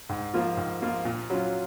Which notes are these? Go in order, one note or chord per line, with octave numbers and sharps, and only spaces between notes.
G#2
F3 A#3 F4
G#2
F3 A#3 F4
A#2
F#3 C#4 F4